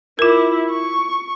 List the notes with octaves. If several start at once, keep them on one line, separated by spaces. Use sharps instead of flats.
E4 F4 A#4
C#6